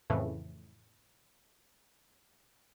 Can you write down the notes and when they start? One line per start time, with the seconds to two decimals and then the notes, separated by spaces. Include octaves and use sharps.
0.10 F2 A2 C#3 E3